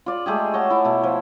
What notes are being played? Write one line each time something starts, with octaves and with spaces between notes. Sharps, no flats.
F4 D5
G#3 A3 G4 G#4
C#5 D#5 F#5 A5
E4
B2 A3
F3